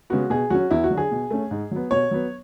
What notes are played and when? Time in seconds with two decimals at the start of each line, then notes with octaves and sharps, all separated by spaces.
0.10 C#3 G#3 B3 F#4
0.30 B2 G#4
0.50 F#3 C#4 F#4
0.71 E2 E4
0.84 F#4
0.90 D3 F#3
0.97 G#4
1.11 B2
1.31 A3 C#4
1.51 G#2
1.71 F#3 B3
1.91 B2 C#5
2.11 F#3 B3